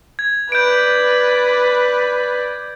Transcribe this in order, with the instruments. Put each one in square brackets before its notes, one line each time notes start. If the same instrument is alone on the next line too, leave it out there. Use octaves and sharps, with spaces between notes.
[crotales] G#6
[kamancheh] B4 D5 [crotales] G6 D7